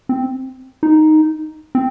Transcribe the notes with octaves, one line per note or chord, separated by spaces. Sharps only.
C4
D#4
C4